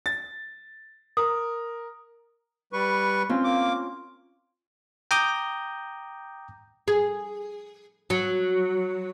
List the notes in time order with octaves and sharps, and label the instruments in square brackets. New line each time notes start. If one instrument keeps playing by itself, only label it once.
[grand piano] A6
[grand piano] A#4 [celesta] D#6
[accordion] G3 B4 C#6
[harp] C4 C#4 F4
[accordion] A#3 D6
[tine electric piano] G5 A#5 D6 D#6 G6
[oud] G#4
F#3